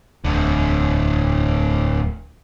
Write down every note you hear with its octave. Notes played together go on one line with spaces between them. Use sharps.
D1 E2 A2 D3